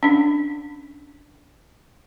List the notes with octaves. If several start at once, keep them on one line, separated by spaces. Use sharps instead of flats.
C#4 D4